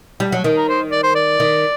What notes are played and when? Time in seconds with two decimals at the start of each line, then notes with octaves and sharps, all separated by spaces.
0.20 G3
0.32 F#3
0.44 D#3
0.57 A#4
0.69 C5
0.91 D5
1.03 C5
1.15 D5
1.40 D#3